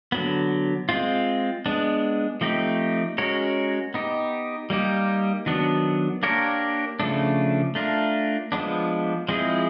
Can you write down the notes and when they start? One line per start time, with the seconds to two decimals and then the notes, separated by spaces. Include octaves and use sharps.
0.12 D3 F#3 B3
0.89 G#3 C4 F4
1.66 G#3 B3 D4
2.41 F3 A3 C4 D#4 G4
3.18 G#3 C#4 F#4 A#4 C#5
3.94 B3 D#4 G4
4.70 G3 A#3 D#4 G4
5.46 D#3 F#3 B3 D4
6.23 A#3 D4 G4 A#4 C#5
7.00 C#3 F3 A3 D4
7.75 A3 D4 F4 A#4
8.52 F3 G#3 B3 D4
9.28 F3 G#3 C4 E4 G#4